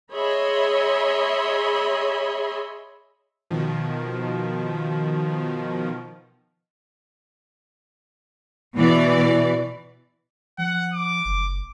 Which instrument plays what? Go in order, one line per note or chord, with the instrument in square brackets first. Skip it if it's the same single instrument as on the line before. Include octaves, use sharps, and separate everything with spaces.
[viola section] G#4 C#5 D#5 E5 B5 C6
[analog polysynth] B2 D#3 F3
[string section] B2 E3 D5
[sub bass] F3 [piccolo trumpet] F#5
[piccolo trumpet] D6
[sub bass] F#1